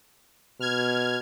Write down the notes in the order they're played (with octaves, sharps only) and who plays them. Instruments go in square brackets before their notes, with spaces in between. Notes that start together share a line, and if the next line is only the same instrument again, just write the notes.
[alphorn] B2 [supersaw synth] F6 G#6